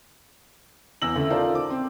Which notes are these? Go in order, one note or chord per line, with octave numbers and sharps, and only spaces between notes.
E2 E6 A#6 F#7
D2 C#3 E5
D#4 F4 A4 A#4 C5 D5
D6
C4